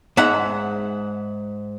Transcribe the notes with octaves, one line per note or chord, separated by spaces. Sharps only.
G#2 E5 F#5 A#5